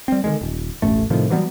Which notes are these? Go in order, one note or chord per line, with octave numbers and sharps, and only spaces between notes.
G3 C4
D3 D#3 G#3
D#1
E1 A1 F#2 A3
A2 C3 D#3 F3
E3 F#3 G3 B3